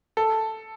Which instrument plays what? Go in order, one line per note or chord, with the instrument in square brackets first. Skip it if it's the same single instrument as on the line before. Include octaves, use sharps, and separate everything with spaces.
[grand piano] A4